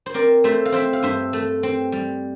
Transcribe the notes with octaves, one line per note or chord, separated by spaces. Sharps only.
C5
C4 A#4 D5
A3 C5 E5
F5
C4 C5 E5
F5
G2 C5 E5
A3
C4
G3